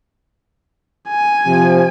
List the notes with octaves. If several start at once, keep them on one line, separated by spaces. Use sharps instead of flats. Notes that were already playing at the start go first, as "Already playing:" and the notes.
G#5
C3 F3